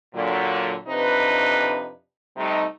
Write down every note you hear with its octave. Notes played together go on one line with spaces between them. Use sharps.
A#2 D3 F#3
F2 C3 D4 D#4 B4
C3 G3 A3 D#4